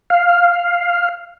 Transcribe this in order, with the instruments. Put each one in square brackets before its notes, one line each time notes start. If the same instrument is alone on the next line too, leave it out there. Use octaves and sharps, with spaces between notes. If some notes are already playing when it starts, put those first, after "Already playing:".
[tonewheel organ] F5